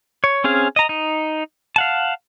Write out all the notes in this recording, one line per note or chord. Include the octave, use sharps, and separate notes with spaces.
C#5
C4 C#4 G#4 F5
D#5 A#5
D#4
F5 F#5 A5